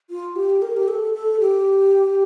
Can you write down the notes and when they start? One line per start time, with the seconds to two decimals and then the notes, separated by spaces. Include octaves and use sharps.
0.10 F4
0.36 G4
0.62 A#4
0.77 G4
0.88 A4
1.14 A4
1.40 G4